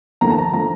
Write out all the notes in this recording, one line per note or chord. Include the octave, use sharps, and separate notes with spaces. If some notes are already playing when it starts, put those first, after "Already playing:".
D#2 D3 F3 A#5
A5
A#5
D3 F3 A#5